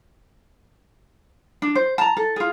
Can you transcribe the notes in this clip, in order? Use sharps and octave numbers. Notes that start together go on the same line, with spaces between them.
D4
C5
A5 A#5
A4
F4 G#4